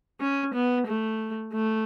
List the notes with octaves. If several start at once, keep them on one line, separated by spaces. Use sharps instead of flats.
C#4
B3
A3
A3